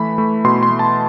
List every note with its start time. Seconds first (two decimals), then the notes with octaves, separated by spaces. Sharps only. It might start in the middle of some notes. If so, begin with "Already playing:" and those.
Already playing: E3 A3 B5
0.18 A3
0.44 B2 C6
0.63 C6
0.71 A3
0.79 A5